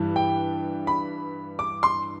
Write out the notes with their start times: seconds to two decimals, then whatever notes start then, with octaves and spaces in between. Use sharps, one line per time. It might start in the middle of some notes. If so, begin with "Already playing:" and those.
Already playing: G2 E3 G3
0.16 G5
0.87 B5
1.59 D6
1.83 C6